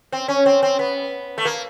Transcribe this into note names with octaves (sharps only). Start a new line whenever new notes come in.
C4
C#4
C4
C4
B3
A3
A#3